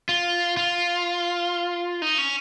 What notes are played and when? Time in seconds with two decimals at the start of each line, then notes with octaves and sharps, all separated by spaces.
0.09 F4
0.57 F4
2.02 D#4
2.18 C#4